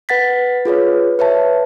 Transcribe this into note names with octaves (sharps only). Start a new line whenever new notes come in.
B4 F#5 A6 B6
F4 G#4 B4 C#5
B4 C#5 E5 A5